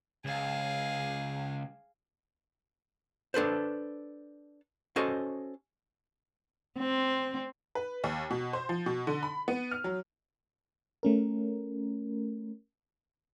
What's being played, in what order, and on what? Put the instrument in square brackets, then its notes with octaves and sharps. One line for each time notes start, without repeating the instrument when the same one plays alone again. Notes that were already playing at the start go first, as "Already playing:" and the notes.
[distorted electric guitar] C#2 [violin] G#4 F5
[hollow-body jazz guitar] D4 A4 B4 C5
C#4 F#4 A4 C5 D#5
[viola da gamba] C4
[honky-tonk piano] B4
D#2
B2
C5
F3
B2
D3
B5
B3
F6
F#3
[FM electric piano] A3 C#4 A#4